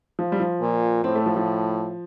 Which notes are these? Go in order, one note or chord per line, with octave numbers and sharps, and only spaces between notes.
F3
G3
F3
A#2
A2 C4
A3
F3
F3